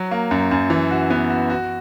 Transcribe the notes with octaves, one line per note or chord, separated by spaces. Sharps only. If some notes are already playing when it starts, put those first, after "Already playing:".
Already playing: F#3
A#3
F#2
F#2
E3
F#4
B3
F#4
F#4